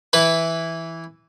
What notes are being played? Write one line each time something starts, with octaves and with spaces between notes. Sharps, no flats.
E3 E4 B4